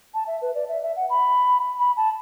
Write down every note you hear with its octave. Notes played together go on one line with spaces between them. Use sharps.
A5
E5
B4
D5
E5
E5
F#5
B5
B5
A5